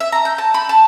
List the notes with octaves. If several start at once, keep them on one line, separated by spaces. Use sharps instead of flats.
E5
A#5
G6
A5
B5
A5